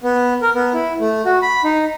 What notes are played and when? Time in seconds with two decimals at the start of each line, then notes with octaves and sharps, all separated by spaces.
0.03 B3
0.42 A#4
0.55 B3
0.74 E4
1.00 A3
1.25 F#4
1.42 B5
1.64 D#4